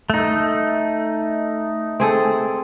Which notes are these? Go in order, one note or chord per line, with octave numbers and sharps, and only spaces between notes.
A3 D#4
C4 G#4 A4